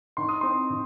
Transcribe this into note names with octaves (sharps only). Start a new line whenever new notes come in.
D#3 C6
D#6
C4 C6
D#3